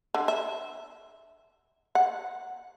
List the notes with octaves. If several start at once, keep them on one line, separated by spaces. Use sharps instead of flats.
D3
E5
F#5